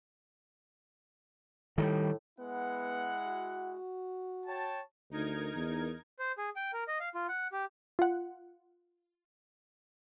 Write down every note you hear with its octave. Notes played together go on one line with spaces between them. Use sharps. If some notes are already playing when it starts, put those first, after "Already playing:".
A2 D#3 F3 G3
G#3 B3 E4 F#5
F#4
C#5 G5 A5
D2 D#4 A#4 G#6
E2
C5
G#4
G5
A#4
D#5
F5
F4
F#5
G4
F4 F#5